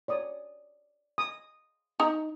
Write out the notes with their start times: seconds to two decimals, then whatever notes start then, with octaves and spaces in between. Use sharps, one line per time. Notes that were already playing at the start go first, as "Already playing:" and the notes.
0.08 C#5 D5 D#6
1.18 D#6
2.00 D#4 A#5